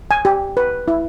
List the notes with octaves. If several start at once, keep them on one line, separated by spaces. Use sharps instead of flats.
G#5
G4
B4
E4